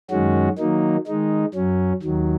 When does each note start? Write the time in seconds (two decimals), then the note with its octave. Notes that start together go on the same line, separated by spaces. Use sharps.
0.10 F#2 D#3 G#3 C#4 F#4
0.58 D#3 F#3 A#3 D#4
1.07 D#3 G#3 D#4
1.54 F#2 F#3 C#4
2.03 D#2 D#3 F#3